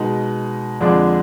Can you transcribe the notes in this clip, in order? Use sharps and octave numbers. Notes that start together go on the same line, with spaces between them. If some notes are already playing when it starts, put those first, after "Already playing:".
Already playing: B2 G#3 D#4
F2 D3 F3 G#3 D4